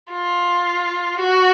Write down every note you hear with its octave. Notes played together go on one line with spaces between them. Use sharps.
F4
F#4